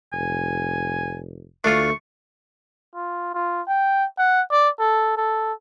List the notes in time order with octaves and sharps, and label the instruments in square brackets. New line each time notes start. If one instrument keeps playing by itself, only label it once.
[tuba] F1 [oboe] G#5
[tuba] D2 [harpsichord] A3 [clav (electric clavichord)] D4 F4 [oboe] C#6
[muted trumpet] F4
F4
G5
F#5
D5
A4
A4